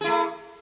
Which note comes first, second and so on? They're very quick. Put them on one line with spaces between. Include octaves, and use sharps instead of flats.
G#4 E4 A3